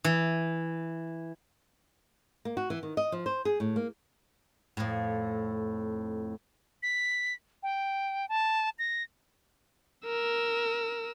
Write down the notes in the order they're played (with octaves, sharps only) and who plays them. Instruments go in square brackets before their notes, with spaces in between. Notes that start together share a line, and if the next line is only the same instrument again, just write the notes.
[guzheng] E3
[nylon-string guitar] A#3
F#4
E3
D#3
D#5
F3
C5
G#4
A2
A#3
[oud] F2 A2
[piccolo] B6
G5
A5
A#6
[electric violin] A#4 E6